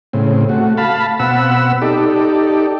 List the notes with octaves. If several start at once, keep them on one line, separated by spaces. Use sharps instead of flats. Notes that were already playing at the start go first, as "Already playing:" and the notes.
A2 C#3 C4
A3 F#4
F5 A5 B5
B2 C4 F#5 B5 E6
D#4 G4 A4 D5